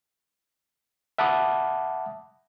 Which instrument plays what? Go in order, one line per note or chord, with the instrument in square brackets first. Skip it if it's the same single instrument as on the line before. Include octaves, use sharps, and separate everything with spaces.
[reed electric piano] E5 F#5 A5 B5 D6 D#6